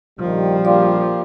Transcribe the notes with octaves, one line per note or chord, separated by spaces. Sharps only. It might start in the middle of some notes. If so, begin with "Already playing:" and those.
A#1 D#3 F3 G3
A#3 F4 G4 D5